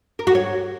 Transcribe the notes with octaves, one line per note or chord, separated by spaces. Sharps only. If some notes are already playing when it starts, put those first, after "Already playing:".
A#4
F#4
C#5